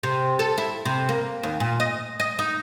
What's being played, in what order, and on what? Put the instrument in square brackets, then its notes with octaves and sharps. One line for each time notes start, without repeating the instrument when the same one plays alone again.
[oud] C3
A4
E4
C3
A#3
D#2
A#2
D#5
D#5
D#4